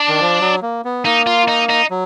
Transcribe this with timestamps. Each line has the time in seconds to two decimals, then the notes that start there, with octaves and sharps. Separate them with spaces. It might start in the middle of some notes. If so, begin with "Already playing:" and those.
Already playing: D4
0.09 D#3
0.20 F3
0.41 F#3
0.62 A#3
0.85 B3
1.05 A#3 D#4
1.27 F4
1.48 D#4
1.69 D#4
1.90 F#3